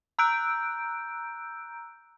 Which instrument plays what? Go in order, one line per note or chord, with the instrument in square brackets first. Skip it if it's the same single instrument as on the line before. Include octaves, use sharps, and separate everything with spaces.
[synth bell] A#5 E6 F#6 G6 D7